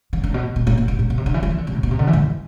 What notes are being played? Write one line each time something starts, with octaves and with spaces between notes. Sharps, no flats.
E3
D3
A2
B2
B2
A2
B2
B2
A2
B2
C3
D3
E3
F3
E3
D3
C3
A2
B2
C3
D3
E3
G#2
F2